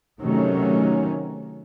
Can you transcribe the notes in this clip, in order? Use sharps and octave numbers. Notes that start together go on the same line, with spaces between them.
C3 D#3 F#3 A3 C#4